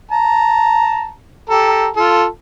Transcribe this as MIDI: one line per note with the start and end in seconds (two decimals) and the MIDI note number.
0.12 1.10 81
0.12 1.10 82
1.49 1.88 67
1.49 1.88 69
1.49 1.88 82
1.96 2.26 65
1.96 2.26 69